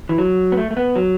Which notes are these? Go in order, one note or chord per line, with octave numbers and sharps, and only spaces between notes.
E3
F#3
B3
A3
A3
B3
F#3